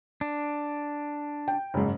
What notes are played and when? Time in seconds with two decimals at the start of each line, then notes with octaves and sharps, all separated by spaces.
0.21 D4
1.48 G5
1.74 F#1 G#2